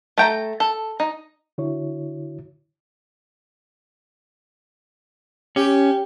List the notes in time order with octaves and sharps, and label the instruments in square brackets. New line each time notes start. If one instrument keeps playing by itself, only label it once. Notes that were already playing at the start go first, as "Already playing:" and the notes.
[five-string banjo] A3 G5 A#5
A4
D#4
[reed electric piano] D3 E4 F#4 C#5
[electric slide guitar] C#4 [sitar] G4